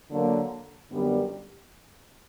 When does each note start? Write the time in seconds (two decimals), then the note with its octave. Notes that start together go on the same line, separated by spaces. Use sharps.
0.11 D3 F#3 A#3
0.92 F#2 D3 G3 B3